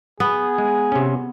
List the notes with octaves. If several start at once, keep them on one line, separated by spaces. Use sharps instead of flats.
B3 G#4
G#3
C3 C#4